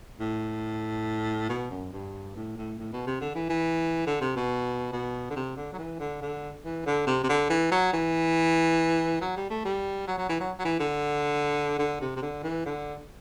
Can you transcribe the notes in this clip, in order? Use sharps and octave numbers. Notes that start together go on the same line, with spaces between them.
A2
B2
F#2
G2
A2
A2
A2
B2
C3
D3
E3
E3
D3
C3
B2
B2
D3
C3
D3
F#3
E3
D3
D3
E3
D3
C3
C3
D3
E3
F#3
E3
F#3
G3
A3
G3
F#3
F#3
E3
F#3
F#3
E3
D3
D3
C3
C3
D3
E3
D3